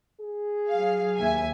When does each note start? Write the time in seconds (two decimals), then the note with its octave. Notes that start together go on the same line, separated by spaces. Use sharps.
0.21 G#4
0.70 F#3 F5
1.18 D#2 E5 G#5